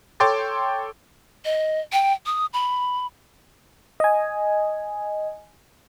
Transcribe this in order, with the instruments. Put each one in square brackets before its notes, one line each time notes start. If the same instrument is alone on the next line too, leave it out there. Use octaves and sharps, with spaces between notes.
[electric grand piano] A4 C#5 G5 C6 D6 A6
[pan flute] D#5
G5
D#6
B5
[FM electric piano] D#5 G#5